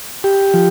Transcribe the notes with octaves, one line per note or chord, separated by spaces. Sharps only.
G4
F3